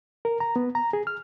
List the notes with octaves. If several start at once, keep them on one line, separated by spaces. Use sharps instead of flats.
A#4
A#5
B3
A#5
G#4
F6